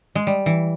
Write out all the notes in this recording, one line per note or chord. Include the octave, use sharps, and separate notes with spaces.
G#3
G3
E3